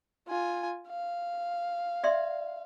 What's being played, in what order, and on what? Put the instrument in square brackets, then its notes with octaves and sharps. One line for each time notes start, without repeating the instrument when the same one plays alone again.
[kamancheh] F4 G#5
F5
[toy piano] D5 E5 C6